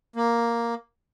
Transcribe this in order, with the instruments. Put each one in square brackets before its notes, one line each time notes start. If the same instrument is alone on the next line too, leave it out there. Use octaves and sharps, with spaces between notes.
[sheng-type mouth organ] A#3